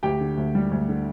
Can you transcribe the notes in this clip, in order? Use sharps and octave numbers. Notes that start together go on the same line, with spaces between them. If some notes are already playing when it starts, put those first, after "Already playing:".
D2 G4 G5
D3
D2
G3
D2
D3